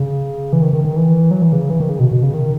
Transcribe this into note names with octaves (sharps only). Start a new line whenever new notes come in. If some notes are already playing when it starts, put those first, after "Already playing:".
Already playing: C#3
E3
D#3
D#3
D#3
E3
F#3
E3
C#3
E3
D#3
C#3
B2
B2
C#3
D#3